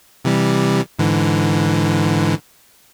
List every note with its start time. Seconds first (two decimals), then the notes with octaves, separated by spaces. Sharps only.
0.25 C3 E3 G3
0.99 G#2 D3 E3